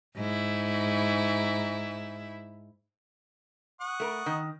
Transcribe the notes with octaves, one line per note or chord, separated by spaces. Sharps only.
G#2 E4
F#5 C#6 D#6
A3 A#4
D#3